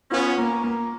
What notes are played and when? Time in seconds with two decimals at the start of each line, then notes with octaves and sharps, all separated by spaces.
0.11 B3 C#4 F4
0.38 A#3
0.63 A#3